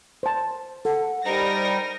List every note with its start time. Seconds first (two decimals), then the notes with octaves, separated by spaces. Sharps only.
0.23 C5 A5
0.85 A4 F#5
1.25 G3 D#4 A#4 C5 A#6